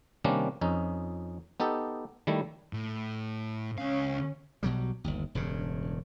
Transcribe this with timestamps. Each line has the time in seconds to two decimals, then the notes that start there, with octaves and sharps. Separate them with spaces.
0.24 C3 D#3 G3 A#3 C#4 D4
0.61 F2 C#4 D#4
1.60 B3 D#4 G4 A4
2.27 D#3 G3 A3 E4
2.73 A2
3.78 C#2 C#4 F5
4.63 B1 B2 F#3 G3
5.04 G1 D#2
5.35 E1 G2 C#3